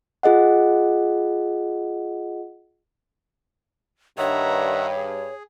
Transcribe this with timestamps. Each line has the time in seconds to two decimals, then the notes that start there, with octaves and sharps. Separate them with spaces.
0.23 F4 G#4 D#5 F#5
4.18 G2 D#3 C#5 E5 F#5 A#5
4.97 G#4